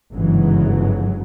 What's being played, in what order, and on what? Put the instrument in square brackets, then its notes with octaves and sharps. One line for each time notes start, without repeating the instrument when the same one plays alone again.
[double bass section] G1 G#2 C#3 E3 F#3